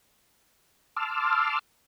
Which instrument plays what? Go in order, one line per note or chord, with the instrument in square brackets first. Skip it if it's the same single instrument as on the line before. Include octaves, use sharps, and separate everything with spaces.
[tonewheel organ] A5 C6 D6 E6 F6